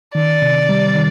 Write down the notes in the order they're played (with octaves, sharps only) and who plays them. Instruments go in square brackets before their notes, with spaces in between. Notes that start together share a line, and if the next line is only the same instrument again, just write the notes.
[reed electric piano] D#3 [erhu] D5
[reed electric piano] C3
G3
D#3